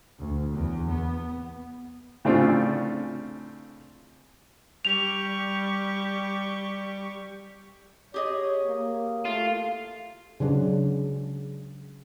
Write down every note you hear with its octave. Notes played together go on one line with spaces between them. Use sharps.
D2
E2
B3
A2 C#3 C4 D4 F4
G3 G4 C#6 F7
G4 G#4 C#5 D#5
A#3
A3 F4
C#3 F#3 D4